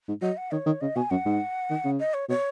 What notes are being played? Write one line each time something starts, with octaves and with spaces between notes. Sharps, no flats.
G#2
F#3 D#5
F#5
D#3 C#5
D#3
C#3 D#5
B2 G#5
F#2 F#5
G#2
D#3
C#3
D#5
C#5
B2 C#5